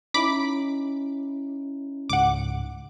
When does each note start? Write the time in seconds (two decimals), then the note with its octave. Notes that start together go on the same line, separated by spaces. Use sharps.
0.14 C#4 D#4 E4 B5 D6
2.09 C#2 G#2 F#5 D6